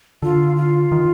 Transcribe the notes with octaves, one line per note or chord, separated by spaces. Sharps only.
D3 F4
F4
D#3